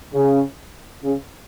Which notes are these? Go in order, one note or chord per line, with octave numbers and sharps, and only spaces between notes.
C#3
C#3